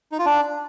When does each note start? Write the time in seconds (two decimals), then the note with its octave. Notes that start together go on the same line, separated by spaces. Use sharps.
0.12 D#4
0.19 F4
0.26 D4